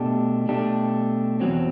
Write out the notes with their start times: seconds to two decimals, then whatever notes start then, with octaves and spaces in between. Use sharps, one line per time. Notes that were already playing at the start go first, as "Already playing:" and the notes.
Already playing: B2 A3 D4 G4
0.49 B2 A3 D4 G4
1.40 E2 B2 F#3 C4